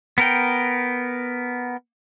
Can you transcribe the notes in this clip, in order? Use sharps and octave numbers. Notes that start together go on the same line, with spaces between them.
B3 A#4 G5